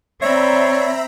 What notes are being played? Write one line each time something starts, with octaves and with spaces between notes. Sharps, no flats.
C4 C#5 D5 E5 A#5 B5